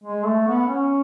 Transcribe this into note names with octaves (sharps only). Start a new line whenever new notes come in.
G#3
A3
B3
C#4